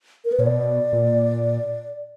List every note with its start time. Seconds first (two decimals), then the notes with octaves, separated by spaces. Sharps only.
0.25 A#4
0.32 B4
0.39 A#2 C#5
0.46 B2 D5
0.93 A#2